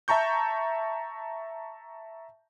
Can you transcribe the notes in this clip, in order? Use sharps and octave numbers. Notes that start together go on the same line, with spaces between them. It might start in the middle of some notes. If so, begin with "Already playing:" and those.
E5 A5 A#5 C#6 G6